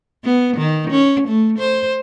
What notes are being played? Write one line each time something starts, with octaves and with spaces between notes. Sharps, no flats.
B3
D#3
C#4
A3
C5